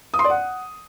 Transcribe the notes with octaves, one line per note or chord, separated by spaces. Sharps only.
D#6
C6
D5
F#5